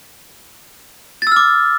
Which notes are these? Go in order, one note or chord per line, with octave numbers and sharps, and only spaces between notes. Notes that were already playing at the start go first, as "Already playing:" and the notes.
D6 E6 F6 A6